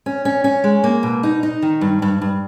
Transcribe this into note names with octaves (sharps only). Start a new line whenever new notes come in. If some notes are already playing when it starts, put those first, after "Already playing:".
C#4
C#4
C#4
G#3
A#3
B2
D#4
D#4
D#3
G2
G2
G2